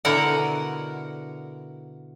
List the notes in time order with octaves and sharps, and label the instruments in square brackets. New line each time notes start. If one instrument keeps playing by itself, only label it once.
[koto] B2 D3 E4 A#4 F#5